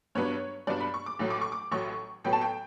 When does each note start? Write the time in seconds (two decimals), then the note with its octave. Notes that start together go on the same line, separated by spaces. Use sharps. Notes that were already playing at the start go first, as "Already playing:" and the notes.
0.15 G2 F#3 B3 D4 C#5
0.67 G2 F#3 B3 D4 D5
0.80 B5
0.94 C#6
1.06 D6
1.19 A1 A2 F#3
1.30 D6
1.41 C#6
1.52 D6
1.72 A1 A2 F#3 C#6
2.24 A2 F#3 B3 G5
2.33 A5
2.41 G5